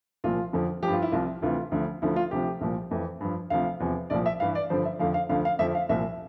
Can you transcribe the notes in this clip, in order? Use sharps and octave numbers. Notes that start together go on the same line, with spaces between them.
C2 A#2 F3 F4
F2 D3 F3
G2 F3 G4
F4
E4
C2 C3 F3 F4
D2 C3 E3 F4
D2 D3 F3
D2 D3 F3 E4
F4
D2 C3 F3 G4
C2 A#2 F3
F2 E3
G2 F3
D2 C3 F3 F5
E2 C3 F3
C2 A#2 F3 D5
E5
G2 E3 F5
D5
G2 D3 F3 C5
E5
F2 D3 F3 F5
F5
D2 D3 F3 F5
F5
F2 D3 F3 E5
F5
C2 A#2 F3 E5